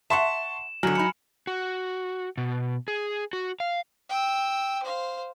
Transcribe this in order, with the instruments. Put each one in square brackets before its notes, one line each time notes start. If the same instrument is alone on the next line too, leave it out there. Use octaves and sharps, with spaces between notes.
[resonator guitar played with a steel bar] E5 F#5 [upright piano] A5 C6 C#6 [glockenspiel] E7
[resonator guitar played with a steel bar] B2 D3 [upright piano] F#3 [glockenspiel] G#5 F6 F#7
[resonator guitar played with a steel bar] G#2 D#4 [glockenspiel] B5 C#7
[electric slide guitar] F#4
B2
G#4
F#4
F5
[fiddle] G5 E6
C5 F5